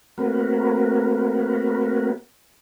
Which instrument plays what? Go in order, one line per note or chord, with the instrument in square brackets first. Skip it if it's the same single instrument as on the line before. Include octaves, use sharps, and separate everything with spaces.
[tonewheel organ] A3 A#3 C4 F#4 A#4 B4